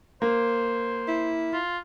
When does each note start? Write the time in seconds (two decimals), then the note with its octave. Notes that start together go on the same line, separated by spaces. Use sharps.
0.22 A#3 C5
1.08 E4
1.53 F4